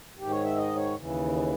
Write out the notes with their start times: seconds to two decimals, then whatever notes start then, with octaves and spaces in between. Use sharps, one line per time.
0.18 G#2 D#3 G4
0.30 C#5
0.44 E5
0.56 D#5
0.75 C#5
0.95 D#2 C#3 E3